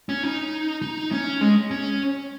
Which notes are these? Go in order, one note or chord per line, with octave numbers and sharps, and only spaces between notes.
C#4
D#4
D#4
C#4
G#3
C#4